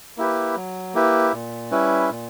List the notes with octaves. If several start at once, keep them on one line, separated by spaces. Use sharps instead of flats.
A#3 E4 G4 B4
F#3
A#3 E4 G4 B4
A#2
G3 C#4 E4 B4
A#2